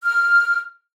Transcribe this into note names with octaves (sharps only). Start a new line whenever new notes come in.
F6